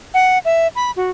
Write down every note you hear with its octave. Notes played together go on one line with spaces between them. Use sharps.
F#5
E5
B5
F#4